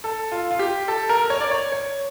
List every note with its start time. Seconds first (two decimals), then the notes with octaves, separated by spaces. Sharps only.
0.04 A4
0.32 F4
0.51 F4
0.59 G4
0.88 A4
1.09 A#4
1.30 C#5
1.41 D5
1.51 C#5
1.72 C#5